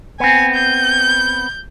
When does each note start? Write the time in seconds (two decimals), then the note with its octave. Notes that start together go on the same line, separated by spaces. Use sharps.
0.20 B3 C4 G#5
0.55 G6